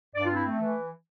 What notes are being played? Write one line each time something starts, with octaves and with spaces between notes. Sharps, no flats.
G2 D5
F4
C4
E4
A3
E3